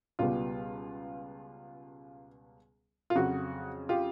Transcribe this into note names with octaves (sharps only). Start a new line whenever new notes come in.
C#2 B2 G3 B3 F4
F4
F2 C#3 F#3 F#4
F4 G4